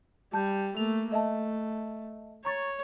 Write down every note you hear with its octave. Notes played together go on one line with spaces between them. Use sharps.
G3 A5 G6
A3 A#3 F7
A3 D#5 E5 A5
C#5 A#5 C#6 A6